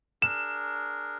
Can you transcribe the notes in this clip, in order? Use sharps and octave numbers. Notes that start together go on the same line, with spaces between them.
D4 G#4 A#4 E7